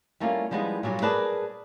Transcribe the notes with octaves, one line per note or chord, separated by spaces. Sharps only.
G3 A3 A#3 C#4 D#4 F4
F3 G3 G#3 B3 D#4
A#2 F#3 G3 D4 F4
G#4 A#4 B4 D5 A5